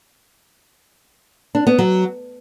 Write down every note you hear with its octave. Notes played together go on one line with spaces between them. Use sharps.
D4
B3
F#3